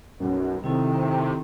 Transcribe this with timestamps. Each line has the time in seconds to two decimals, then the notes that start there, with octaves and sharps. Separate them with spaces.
0.20 B1 F#2
0.64 C3 D#3 C4 E4 A4